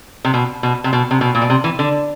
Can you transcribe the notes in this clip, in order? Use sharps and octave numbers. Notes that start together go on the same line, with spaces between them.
C3
B2
B2
C3
B2
C3
B2
A#2
B2
C3
E3
D3